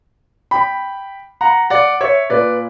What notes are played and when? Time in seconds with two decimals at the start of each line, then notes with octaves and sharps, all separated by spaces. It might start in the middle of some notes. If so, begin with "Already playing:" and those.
0.51 G5 B5
1.41 F#5 A#5
1.70 D5 F#5
2.01 C#5 E5
2.30 A#2 B4 D5